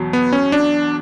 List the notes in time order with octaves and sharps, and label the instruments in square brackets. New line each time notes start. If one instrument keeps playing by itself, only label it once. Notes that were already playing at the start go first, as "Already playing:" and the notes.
Already playing: [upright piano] E2 B2 F#3
[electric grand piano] B3
C#4
D4